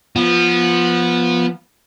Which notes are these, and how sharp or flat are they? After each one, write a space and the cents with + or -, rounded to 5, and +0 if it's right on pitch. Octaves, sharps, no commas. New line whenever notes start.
F3 +0 B3 -15